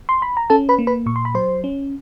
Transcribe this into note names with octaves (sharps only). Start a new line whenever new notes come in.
C6
B5
A#5
C#4 A4 A5
B4 B5
A#3
B4 B5
A#2 C#6
C6
B5
F#3 C5 C6
C#4